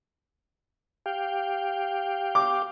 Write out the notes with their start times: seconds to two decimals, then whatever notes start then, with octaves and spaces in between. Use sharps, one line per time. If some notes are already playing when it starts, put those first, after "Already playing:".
1.06 G4 F5 G5
2.35 D6